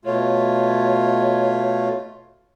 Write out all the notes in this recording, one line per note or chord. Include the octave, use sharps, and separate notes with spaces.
B2 A3 F4 C#5